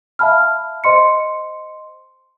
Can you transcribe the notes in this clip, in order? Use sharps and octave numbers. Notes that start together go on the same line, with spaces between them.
E5 F5 A5 B5 F6
C5 D#5 C6 C#7